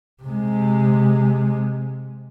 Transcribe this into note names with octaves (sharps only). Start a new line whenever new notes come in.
C3 G#3